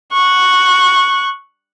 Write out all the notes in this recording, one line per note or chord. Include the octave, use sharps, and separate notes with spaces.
C#6 F#6